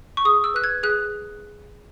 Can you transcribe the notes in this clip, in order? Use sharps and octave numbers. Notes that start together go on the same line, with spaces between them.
C#6
G#4 D#6
E6
B4 F#6
G#6
G#4 F#6